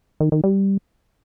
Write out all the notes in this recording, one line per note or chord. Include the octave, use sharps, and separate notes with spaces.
D#3
D#3
G3